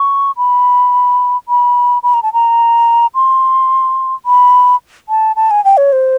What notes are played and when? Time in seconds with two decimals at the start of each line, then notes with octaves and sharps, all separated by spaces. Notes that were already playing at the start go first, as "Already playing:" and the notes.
Already playing: C#6
0.37 B5
1.49 B5
2.03 B5
2.14 A#5
2.23 A5
2.33 A#5
3.15 C6
4.26 B5
5.09 A5
5.36 A5
5.51 G#5
5.65 G5
5.77 C#5
5.92 C5